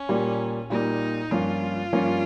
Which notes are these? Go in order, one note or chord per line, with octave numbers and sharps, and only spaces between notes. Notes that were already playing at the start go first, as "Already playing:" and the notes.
Already playing: C#4
A#2 G3 A#3
A#2 G3 A#3 D#4
G2 F3 A#3 C#4 F4
G2 F3 A#3 C#4